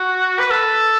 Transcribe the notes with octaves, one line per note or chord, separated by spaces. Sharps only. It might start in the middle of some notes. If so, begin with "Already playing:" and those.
Already playing: F#4
B4
A4